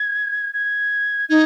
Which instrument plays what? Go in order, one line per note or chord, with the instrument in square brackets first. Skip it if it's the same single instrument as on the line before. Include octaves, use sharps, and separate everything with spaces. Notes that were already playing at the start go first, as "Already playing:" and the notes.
Already playing: [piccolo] G#6
G#6
[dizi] D#4 [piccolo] G#6